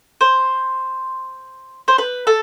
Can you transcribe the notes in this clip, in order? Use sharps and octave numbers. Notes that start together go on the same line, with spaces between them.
C5
C5
B4
A4